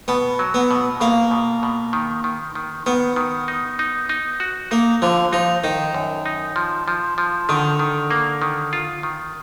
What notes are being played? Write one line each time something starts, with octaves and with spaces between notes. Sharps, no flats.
B2 B3
F#3
B3
B2
B2 A#3
B2
B2
D#3
D#3
D#3
D#3 B3
D#3
D#4
D#4
D#4
F#4
A#3 D#4
D3 F3
F3 D#4
D#3 D#4
F#2
D#4
F3
F3
F3
D3 D#3
D#3
A#3
D#3
F4
D#3